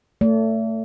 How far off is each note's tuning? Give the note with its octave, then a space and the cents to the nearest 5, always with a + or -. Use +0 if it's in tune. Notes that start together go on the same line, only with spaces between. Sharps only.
A3 +20 D5 -40